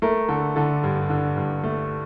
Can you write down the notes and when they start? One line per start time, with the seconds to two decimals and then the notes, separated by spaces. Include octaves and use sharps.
0.02 A3 A#4
0.28 D3 A4
0.56 D3 A4
0.84 G2
1.10 D3
1.36 G2
1.64 A3